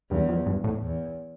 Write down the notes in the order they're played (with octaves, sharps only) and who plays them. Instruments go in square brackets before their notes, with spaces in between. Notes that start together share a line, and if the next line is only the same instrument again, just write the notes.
[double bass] E2 [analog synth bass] G2
[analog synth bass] F2
G2
A2
[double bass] E2